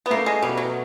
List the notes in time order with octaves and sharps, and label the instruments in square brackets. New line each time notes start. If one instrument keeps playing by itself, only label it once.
[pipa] B3
[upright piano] A3 [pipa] A#3
[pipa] G#3
[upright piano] B2 [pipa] G3
[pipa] F#3